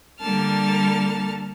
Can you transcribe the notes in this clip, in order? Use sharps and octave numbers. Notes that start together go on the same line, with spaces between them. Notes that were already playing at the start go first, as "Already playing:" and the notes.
D3 G3 A#3 A5 F6